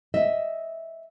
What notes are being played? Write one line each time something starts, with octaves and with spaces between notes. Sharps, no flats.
D#5 E5